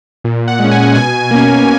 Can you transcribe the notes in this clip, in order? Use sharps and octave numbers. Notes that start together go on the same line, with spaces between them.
A#2
F#5
G#3 C#4
G#5
B2 G#5
A#3 C#4